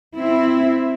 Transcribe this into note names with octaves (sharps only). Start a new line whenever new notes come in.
C4 E4